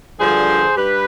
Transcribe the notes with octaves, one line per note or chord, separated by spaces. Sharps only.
G2 D3 F3 G#4 C5
G2 G4 B4